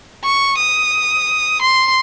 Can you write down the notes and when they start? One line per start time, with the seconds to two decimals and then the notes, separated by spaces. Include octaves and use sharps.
0.24 C#6
0.58 D#6
1.62 C6